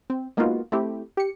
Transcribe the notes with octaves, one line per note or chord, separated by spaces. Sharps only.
C4
G#3 A#3 B3 D#4 F4 F#4
A3 C4 E4 G4
G4 C#7